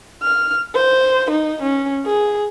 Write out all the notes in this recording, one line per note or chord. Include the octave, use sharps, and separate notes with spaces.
F6
C5
D#4
C#4
G#4